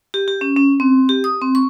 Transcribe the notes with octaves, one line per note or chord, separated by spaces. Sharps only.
G4
G4
C#4
C#4
C4
G4
D#6
C4
C#6